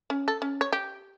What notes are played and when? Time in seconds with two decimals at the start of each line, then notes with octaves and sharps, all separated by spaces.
0.10 C#4
0.28 A4
0.42 C#4
0.61 C#5
0.72 G4